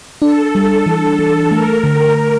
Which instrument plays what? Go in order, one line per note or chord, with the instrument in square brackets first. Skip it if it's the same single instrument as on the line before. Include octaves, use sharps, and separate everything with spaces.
[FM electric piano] D4 [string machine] A4
[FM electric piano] G3
E3
E3
[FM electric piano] A3 [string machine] A#4
[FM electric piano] D3